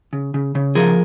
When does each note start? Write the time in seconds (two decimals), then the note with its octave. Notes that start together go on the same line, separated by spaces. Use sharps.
0.13 C#3
0.34 C#3
0.55 C#3
0.75 F3 G#4 A#4